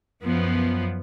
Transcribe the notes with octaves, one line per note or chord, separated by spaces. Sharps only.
F#2 F3 B3